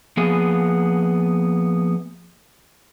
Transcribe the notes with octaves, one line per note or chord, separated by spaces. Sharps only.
F3 A#3 B3 G#4